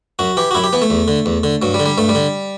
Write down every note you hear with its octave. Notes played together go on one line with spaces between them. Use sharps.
F#2 F#4
E3 G4
F#4
F#2 E4
G4
E3 B3
A3
E2
D3
E2
D3
G2 F#3
G3
D3
G3
G2 A3
G3
D3